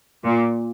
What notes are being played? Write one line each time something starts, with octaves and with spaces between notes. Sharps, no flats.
A#2